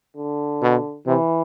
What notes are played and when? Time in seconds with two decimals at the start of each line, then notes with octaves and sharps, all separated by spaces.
0.16 D3
0.62 B2
1.07 C3 E3